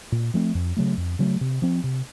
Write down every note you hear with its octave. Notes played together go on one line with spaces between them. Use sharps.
A#2
F3 A3 C4
F2
C#3 F#3 A3
F2
C#3 F#3 A3
C3
F3 C4
C3